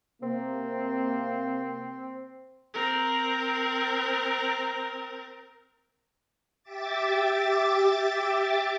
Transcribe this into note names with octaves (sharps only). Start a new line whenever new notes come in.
C3 A#3 C4
C4 A#4
G4 E5 D6 A6